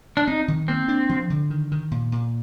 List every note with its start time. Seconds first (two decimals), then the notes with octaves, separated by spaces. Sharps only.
0.17 D4
0.27 C4 D#4
0.48 D#3
0.68 A#3 C4
0.88 D4
1.09 F3
1.30 D3
1.50 D#3
1.72 D#3
1.91 A#2
2.12 A#2